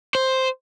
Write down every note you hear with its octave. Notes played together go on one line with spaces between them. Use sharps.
C5